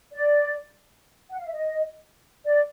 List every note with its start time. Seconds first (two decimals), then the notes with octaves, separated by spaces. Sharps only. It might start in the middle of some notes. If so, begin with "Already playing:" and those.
0.12 D5
1.30 F#5
1.37 F5
1.46 E5
1.52 D#5
2.46 D5